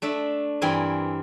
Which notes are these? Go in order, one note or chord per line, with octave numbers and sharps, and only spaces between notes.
A3 D4 E5
G2 E3 C4 A#4 G#5